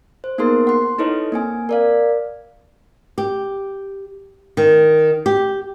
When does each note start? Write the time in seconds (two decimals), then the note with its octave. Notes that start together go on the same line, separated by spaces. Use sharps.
0.24 C5
0.38 A#3 B3 D#4 G#4 A#4 C6
0.67 F#5 C6
0.99 D#4 E4 A4 B4 C#5 D#5
1.32 A#3 C4 G#5
1.69 A#4 D5 F5
3.18 G4
4.57 D#3
5.26 G4